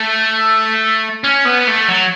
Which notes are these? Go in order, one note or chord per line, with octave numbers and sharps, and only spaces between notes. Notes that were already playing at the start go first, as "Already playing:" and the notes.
Already playing: A3
C#4
B3
A3
F#3